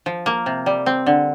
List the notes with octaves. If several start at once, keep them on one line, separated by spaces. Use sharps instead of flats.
F3
A#3
C3
G3
C4
D3